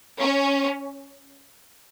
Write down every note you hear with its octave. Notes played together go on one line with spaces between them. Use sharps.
C#4